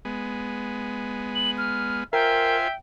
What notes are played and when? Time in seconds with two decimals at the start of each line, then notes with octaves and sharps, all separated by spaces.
0.05 G#3 B3
1.35 F#7
1.58 F6
2.13 F4 A#4 C5 E5 G5 G#5